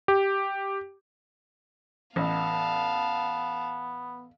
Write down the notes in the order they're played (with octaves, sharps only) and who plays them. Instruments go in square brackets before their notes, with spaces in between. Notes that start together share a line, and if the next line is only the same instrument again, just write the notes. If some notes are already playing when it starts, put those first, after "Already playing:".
[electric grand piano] G4
[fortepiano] A1 [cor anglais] B3 [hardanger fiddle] F5 A5